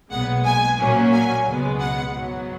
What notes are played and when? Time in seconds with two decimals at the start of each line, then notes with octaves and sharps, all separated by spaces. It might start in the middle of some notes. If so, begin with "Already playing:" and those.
0.10 B1 A#2 G#3 B3 F#5
0.45 G#5
0.78 A#2 F#3 A#3 C#4
1.12 G#5
1.46 C#2 B2 G#3 B3
1.80 F#5
2.14 G#2 F#3 B3